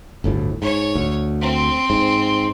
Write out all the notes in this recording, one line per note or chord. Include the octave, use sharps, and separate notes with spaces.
G1 D2 A2
G#2 C#5
D2
C4
G#2